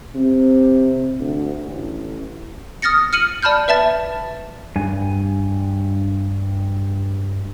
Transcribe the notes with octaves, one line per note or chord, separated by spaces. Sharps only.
C3
D2
A1
D#6 F6 A6 A#6 C#7
F6 C#7 D#7 F#7
D5 A5 B5 F6 G6
B4 E5 A5 A6
G2 G#5